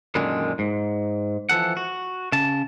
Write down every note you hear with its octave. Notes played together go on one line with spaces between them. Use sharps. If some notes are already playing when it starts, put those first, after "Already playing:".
F#2 A#2 D3 D#3 G#3
G#2
E3 F3 A4 F#5
F#4
C#3 A5